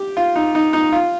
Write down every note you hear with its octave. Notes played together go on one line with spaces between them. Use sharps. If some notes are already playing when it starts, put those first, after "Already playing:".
Already playing: G4
F4
D#4
D#4
D#4
F4